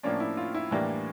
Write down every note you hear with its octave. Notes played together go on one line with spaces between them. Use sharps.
A2 F3 A#3 C#4 D4
E4
F4
E4
A2 E3 G3 A#3 D4